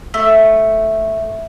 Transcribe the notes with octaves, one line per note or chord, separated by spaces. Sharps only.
A3